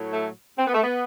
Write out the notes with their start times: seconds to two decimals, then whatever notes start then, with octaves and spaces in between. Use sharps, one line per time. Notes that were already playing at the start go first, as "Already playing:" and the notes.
Already playing: A2 F#3
0.12 A3
0.58 C4
0.67 B3
0.74 A3
0.84 B3